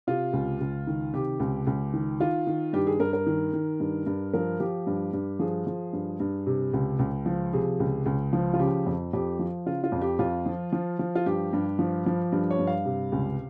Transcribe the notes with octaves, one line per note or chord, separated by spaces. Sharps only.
C3 F4
C#2
C#2
D#3
C3 G4
C#2
C#2
D#3
D#3 F4
D#3
G2 G4
G#4
G2 A#4
A#4
D#3
D#3
G2
G2
F3 A#4
F3 G4
G2
G2
F3 G#4
F3
G2
G2
C3
C#2
C#2
F3
C3 G#4
C#2
C#2
F3
F4
C#3 G4
F2
F2 G4
F3
C#3 F4
F4
F2
G4
F2 F4
F3
F3
F3
F4
G2 G4
G2
F3
F3
G2
C#5
G2
F5
C3
C#2